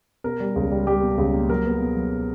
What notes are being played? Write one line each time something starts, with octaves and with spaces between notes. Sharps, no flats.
B2 A#4
G3
C#2
G3
G3 G4
B2
C#2
A#3
F#3 A#4
B3
B2
F#3
B2